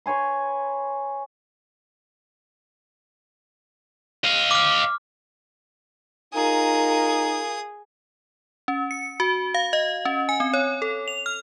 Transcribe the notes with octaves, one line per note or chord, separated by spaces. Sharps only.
B4 C#5 G#5 C6
D#5 F5
D6 F6
D#4 F4 G#4 A#4 D#6
C#4
C#7
F#4
F5
D#5
C#4
G#5
C4
C#5
A4
F7
F6